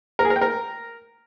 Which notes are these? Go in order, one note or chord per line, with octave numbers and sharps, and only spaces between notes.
A#4
G#4
A#4
G5
A#4